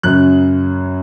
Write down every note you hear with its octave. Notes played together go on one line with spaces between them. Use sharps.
F#2 C#3 F#3 C#4 F#6